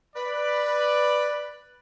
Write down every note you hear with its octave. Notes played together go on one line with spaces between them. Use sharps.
B4 D5